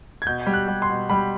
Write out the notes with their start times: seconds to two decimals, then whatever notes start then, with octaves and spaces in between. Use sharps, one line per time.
0.22 G#6
0.26 B2 G6
0.47 G3
0.54 F#6
0.68 G3
0.82 C6
0.90 B2
1.10 G3 B5